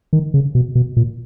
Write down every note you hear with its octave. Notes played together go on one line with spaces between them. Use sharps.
D#3
C#3
B2
B2
A#2